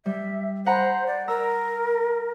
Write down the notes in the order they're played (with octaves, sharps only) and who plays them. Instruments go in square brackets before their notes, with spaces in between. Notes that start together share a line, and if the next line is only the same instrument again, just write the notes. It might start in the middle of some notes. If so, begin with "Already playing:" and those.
[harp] G3 [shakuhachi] E5
[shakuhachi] C5 [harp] F#5 A#5 B5
[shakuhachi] D5
[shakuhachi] A#4 [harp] A#5 E6